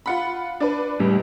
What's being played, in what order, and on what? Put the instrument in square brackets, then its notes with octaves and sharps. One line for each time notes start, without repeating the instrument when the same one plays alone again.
[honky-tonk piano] F4 F#5 B5
D4 B4
[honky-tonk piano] C#2 [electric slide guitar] A2 G3